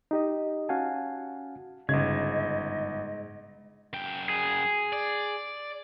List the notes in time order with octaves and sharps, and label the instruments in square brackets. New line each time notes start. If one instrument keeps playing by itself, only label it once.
[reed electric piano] D#4 G4 D#5
C#4 F#4 F5 F#5 G#5 A5
[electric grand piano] G1 G#6 [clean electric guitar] G#2 [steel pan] C#3 [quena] D#5
[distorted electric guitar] F#2 G5
[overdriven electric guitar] G#4
[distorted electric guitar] D5